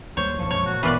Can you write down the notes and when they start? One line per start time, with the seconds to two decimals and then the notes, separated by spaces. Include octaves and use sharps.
0.17 D#2 G3 A#3 C5 C#5
0.39 D#1 C2 G2 F3 A5 C#6
0.51 B1 F#2 G#3 C#5
0.66 A#2 F#4
0.83 A#1 B2 E3 B3 F4 A#4 B4 D5